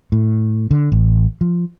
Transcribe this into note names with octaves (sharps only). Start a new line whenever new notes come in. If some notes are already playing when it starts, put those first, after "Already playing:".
A2
D3
A1
F3